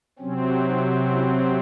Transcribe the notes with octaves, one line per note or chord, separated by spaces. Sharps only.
C3 F#3 C4 C#4
D#4
C#4 E4